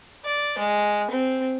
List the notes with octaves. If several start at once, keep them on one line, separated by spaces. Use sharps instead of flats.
D5
G#3
C4